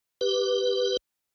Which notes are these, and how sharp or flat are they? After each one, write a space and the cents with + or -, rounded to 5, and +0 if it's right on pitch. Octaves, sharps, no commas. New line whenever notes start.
G4 +0 B4 +0